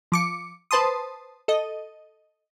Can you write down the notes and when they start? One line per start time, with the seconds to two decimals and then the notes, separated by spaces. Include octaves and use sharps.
0.12 F3 D6 C#7
0.71 B4 C5 A5 C6 D#6
1.48 A4 D#5